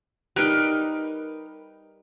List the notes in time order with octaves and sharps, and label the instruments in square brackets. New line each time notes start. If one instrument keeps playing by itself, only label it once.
[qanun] G3 D#4 [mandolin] A#4 B4 F#6